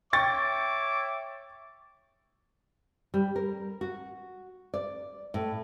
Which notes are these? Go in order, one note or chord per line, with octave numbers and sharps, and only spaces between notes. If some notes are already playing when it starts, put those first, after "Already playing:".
C#5 E5 G5 C#6 D6 A6
G3
A#4
F#4
D5
A2